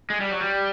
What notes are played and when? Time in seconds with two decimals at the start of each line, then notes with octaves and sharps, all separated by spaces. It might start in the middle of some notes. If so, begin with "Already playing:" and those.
0.10 G#3
0.20 G3
0.30 F#3
0.41 G3